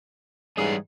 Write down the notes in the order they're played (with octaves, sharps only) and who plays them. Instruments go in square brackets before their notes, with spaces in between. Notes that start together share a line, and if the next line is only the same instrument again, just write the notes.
[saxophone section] G#2 E3 G#4 [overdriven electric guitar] G3 C#4